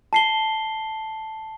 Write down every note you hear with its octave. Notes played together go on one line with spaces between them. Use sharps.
A5 C7 G7